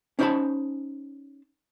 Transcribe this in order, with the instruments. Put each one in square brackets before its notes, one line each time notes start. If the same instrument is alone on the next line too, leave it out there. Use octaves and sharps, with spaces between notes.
[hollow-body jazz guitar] C#4 D#4 E4 C5 A5 B5